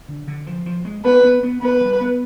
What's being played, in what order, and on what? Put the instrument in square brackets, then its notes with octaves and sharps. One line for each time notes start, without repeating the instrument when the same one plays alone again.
[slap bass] D3
D3
F3
F3
G#3
[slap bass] B3 [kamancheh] B4
[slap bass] B3
B3
[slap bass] B3 [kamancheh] B4
[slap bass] G3
B3